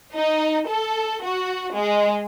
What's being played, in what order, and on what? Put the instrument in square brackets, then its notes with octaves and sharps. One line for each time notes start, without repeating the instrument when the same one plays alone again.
[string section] D#4
A4
F#4
G#3